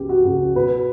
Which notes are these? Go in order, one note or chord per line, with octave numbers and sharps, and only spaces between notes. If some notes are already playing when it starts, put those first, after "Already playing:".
Already playing: C#2 C#3 B3 G4
F#4
C#2
B2 B4